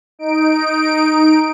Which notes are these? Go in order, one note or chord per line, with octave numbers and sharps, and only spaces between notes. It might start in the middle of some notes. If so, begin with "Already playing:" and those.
D#4 D7